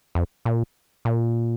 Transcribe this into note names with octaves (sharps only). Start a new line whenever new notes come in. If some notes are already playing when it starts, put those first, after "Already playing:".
F2
A#2
A#2